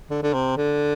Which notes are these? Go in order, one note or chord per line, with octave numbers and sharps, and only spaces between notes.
D3
D3
C3
D3